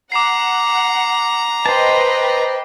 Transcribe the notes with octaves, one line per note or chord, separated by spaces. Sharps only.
F#5 A#5 D6 C7
B4 C5 D#5 G5 A5